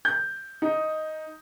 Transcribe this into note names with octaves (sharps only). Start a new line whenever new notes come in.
G6
D#4